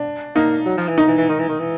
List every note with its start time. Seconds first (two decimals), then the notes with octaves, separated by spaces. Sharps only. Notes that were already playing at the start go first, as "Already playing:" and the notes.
Already playing: D4
0.36 A#3 D#4
0.66 F#3
0.77 F3
0.88 E3
0.98 D#3 D#4
1.08 E3
1.18 E3
1.29 D#3
1.39 E3
1.49 D#3
1.60 E3